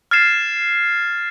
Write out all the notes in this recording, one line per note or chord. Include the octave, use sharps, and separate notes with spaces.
F6 G#6 A6 C7 E7